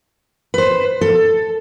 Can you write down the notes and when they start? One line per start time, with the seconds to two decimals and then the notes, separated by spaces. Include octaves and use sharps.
0.54 B4 C5
1.01 A4